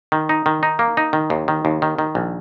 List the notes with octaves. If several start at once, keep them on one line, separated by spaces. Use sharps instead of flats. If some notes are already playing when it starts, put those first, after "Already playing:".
D#3
D#4
D#3
D#4
A#3
D#4
D#3
D#2
D#3
D#2
D#3
D#3
A#1